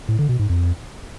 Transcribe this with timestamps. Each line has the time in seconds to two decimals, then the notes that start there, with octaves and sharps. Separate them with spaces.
0.08 A2
0.19 D3
0.29 B2
0.39 G#2
0.49 F2